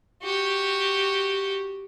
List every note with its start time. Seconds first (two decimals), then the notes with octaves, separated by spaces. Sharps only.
0.22 F#4 G4